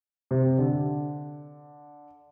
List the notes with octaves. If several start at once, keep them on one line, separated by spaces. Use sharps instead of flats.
C3
D3